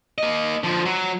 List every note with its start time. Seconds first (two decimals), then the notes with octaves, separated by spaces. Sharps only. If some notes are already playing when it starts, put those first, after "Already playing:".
0.18 A#3 D#5
0.63 D3 F3
0.85 F#3